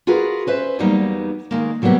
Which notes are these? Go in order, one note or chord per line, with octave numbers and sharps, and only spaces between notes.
F4 F#4 G#4 A#4 B4
C#4 B4 C5 E5
E2 F#3 G3 A#3 B3 D#4
D#3 G#3 A#3
C3 F#3 G3 A#3 B3 G4